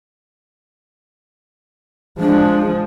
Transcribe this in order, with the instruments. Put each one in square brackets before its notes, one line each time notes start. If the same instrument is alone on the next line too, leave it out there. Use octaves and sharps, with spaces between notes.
[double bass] F3 G#3 [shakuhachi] D4